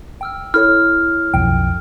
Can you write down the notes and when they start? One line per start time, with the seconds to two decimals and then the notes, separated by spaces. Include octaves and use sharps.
0.21 G5 E6 F6
0.54 E4 A4 C#5 F6
1.34 B1 F2 G5